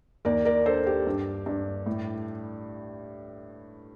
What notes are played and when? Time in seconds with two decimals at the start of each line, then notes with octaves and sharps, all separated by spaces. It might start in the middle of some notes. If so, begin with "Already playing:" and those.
0.25 D#2 A#4 D5
0.45 A#4 D5
0.66 D4 A4 C5
0.87 G4
1.07 G2
1.46 G2
1.86 A2